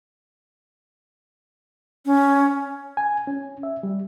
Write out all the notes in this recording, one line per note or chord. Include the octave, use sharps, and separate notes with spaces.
C#4
G#5
C#4
E5
G3